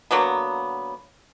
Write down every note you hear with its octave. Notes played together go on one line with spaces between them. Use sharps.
D3 F#3 A#3 B3